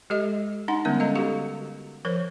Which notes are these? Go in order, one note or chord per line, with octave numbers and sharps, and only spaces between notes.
G#3 G4 A4 D#5
D4 D#4 F#5 C6
D3 G3 G#3 B3 C#4 E5
D3 A4 D#5 F5
F#4 G4 A4 F5
F3 A#4 C5 C#5